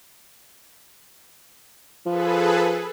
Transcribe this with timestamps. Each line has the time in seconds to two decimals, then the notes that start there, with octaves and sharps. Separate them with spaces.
2.06 F3 G#4 A4 B4